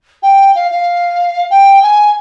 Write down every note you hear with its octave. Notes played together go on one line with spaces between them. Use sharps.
G5
F5
F5
G5
G#5